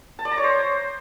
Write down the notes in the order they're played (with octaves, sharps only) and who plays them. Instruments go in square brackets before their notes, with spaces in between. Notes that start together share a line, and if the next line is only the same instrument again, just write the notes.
[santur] A5
D5
A#5
C#5
C5